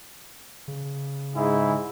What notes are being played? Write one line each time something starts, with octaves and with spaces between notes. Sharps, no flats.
C#3
G#2 E4 G#4